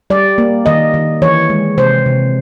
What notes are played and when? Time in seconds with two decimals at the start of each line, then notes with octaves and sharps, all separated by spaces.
0.10 G3 D5
0.38 A#3
0.66 D#3 D#5
0.94 D#3
1.22 E3 C#5
1.50 G#3
1.78 C3 C5
2.06 C3